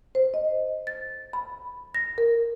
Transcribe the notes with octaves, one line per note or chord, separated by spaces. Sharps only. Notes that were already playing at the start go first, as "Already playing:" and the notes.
C5
D#5
A6
B5
A#6
A#4